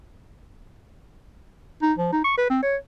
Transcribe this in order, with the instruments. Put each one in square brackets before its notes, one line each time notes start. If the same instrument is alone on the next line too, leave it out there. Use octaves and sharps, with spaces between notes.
[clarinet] D#4
F3
D#4
C#6
B4
C4
C#5